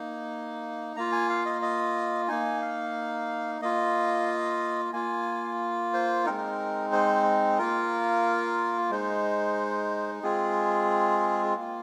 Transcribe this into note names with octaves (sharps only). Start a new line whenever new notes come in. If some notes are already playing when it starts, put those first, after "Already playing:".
Already playing: A#3 D#4
A#3 F4 A#5
G#5
F5
D#5
D#5
A#3 D#4 G#5
F5
A#3 F4 D#5
A#3 F4 G#5
C5
G#3 C4 D#4 A#4
C5
A#3 F4 A#4
G#3 D#4 C5
G#3 C4 F4 G#4
A#3 F4